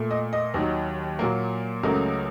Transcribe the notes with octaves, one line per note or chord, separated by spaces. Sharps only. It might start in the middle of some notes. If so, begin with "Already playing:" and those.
Already playing: A#2 A3
D#5
D#5
D#2 D#3 F#3
A#2 F#3 A#3
C#2 C#3 F#3 A3 A#4